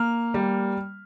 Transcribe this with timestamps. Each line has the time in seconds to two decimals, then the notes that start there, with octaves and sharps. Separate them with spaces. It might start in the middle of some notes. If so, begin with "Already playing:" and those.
Already playing: A#3 F6
0.34 G3